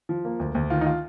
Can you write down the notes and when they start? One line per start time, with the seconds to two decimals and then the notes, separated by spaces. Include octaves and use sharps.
0.09 F3
0.25 A#3
0.40 D2
0.55 D2
0.70 D#3 F4
0.81 D#4
0.86 F4